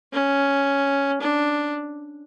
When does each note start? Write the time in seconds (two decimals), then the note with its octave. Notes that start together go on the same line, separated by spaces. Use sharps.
0.13 C#4
1.22 D4